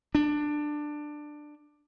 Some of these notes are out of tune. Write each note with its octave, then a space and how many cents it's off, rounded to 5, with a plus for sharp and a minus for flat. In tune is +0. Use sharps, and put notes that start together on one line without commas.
D4 +15